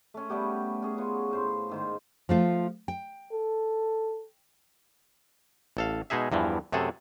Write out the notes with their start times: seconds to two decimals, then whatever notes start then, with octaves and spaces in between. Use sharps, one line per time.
0.14 A3 C#4
0.30 G3 A3 B3 G4
0.82 C#4 G#4
0.98 B3 F4 C#5
1.31 A2 C5 F5
1.69 G#2 D#3 C5
2.29 F3 A3 F4
2.88 G5
3.32 A4
5.77 A1 A4 F5
6.10 B2 G#3 D#4 G#4 E5
6.32 E2 G2 E3 F3
6.72 F#2 C3 A3 G#4 A4